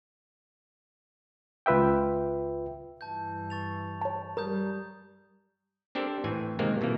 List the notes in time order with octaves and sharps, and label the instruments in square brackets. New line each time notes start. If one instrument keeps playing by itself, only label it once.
[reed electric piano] C#2 F4 B4 E5 G5
[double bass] G2 E3 [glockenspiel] A5 G6
[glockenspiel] C#6 A6 F7
[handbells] C#5 A5
[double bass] G3 [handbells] A#4 [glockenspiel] A#5 D#6 G6
[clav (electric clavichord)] C4 D4 G4 A4 A#4 C5
A2 E3 C4 G#5
C3 D#3 G#3 A#3 C4 A#4
B2 E3 A3 A#3